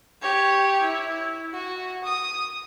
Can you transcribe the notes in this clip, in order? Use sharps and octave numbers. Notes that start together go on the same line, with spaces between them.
G4 C#5
E4
F#4
D#6